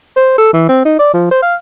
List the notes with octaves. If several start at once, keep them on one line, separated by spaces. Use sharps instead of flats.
C5
A4
E3
C4
D#4
D5
F3
C5
F5